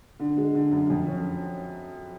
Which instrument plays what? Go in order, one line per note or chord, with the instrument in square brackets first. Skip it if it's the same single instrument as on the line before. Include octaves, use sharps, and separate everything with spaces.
[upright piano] D3
G#3
D3
F#2
F2
C#4